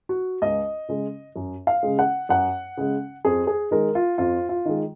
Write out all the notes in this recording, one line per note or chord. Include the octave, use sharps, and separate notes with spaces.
F#4
C#2 D#5
C#3 G#3
F#2
F5
C#3 G#3
F#5
F#2 F#5
C#3 G#3
F2 G#4
G#4
D#3 G#3 A#4
F4
F2 F4
F4
D#3 G#3